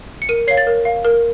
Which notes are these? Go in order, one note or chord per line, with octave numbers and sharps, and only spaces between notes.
C#7
A#4 D#7
C#5 F5 C7
A6
A#4
F5
A#4